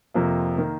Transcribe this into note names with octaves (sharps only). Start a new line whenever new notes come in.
F2 C3 F3 A#3
D#3 A#3